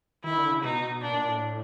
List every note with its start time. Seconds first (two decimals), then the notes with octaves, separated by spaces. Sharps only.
0.24 D#3 E4
0.37 D3
0.51 C#3
0.63 B2 D#4
1.02 A#2 D4
1.15 A#2
1.28 A2